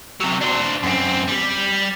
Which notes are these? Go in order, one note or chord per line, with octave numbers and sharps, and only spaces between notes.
C3 F#3
D4 C5
F#2 C4
G3